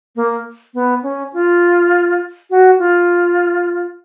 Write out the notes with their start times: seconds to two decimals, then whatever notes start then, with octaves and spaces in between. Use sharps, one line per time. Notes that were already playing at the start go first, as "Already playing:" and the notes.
0.16 A#3
0.74 B3
1.03 C#4
1.33 F4
2.50 F#4
2.79 F4